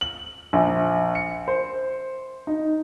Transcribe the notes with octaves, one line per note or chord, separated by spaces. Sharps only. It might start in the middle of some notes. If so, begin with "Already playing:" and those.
F#7
A#1
C#7
C5
D#4